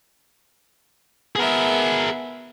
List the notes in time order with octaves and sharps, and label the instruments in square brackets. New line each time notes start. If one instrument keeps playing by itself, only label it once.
[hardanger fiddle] B3 E5 [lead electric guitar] G#4 A#4